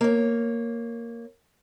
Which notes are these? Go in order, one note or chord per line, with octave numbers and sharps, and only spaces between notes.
A#3 C#5